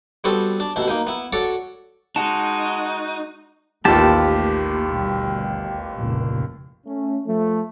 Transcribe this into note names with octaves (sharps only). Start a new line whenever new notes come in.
G3 B3 C4 F#4 A4 B4
D4
A1 B2 E4
A#3 D#4 B4
B3 E4
F#4 A4 C#5 D5 F#5
G#3 D#4 F#4 F#5 A5
A1 D#2 A3 A#3 F4 G4 A5
D2 B2 G3
F1 C#2 A#2
A3 C#4
F3 A3